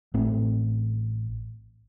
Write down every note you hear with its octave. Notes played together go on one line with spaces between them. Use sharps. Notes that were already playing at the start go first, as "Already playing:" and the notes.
A1 A2 A3 C4